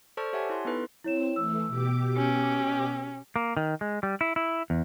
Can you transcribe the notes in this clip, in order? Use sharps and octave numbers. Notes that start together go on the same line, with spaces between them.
A4 C5 D5 A5 C#6 F6
G4 C#5 E5 F#5 G#5 A5
E4 C6
B3 D#4 E4 A4 B4
C4 E4 C#5 E7
E3 A3 E6
B2 G4 D6
C#4
A#3
D#3
G#3
G3
E4
E4
E2